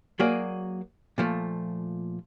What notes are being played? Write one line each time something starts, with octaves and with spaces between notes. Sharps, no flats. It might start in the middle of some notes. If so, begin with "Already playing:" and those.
F#3 A#3 F#4 G#4 D5
A#2 F3 A3